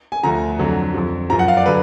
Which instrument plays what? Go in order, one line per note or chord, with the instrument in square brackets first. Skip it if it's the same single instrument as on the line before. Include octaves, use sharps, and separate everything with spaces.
[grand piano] G#5
D2 D3 F3 A#5
F2 D3 F#3
F2 F3
F#2 F3 A#5
F#5
F5
D5
D3 F#3 B4